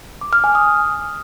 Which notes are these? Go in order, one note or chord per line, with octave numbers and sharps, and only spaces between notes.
D6
F6
G#5
D#6